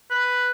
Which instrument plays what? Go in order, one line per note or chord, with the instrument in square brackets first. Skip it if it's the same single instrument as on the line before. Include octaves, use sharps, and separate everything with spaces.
[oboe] B4